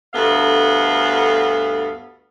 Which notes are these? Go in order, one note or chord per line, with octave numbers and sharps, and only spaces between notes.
D2 G2 B3 A4 F5